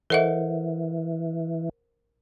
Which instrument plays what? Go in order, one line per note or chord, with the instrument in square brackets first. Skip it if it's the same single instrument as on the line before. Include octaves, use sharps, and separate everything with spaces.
[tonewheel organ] E3 [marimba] A4 D#5 E5 [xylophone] A#4 C5 F#5